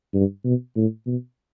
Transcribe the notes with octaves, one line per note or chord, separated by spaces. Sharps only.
G2
B2
A2
B2